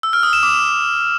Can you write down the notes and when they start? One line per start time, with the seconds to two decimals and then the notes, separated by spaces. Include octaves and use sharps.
0.03 E6
0.13 F6
0.23 D#6
0.33 E7
0.43 D6